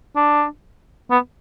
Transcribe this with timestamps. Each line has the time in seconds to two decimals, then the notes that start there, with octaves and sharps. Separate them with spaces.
0.16 D4
1.11 B3